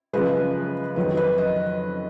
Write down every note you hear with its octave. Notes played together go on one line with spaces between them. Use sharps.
F#2 C#3 F3 G#3 B4
F2 D#3 F#3 B4
B4
D#5